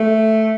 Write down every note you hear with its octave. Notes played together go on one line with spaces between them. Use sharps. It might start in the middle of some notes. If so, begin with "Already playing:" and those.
Already playing: A3